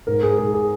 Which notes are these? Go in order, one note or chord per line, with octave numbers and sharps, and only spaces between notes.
G#2 A#4
G#2 G#4
G#2 G#4
G#4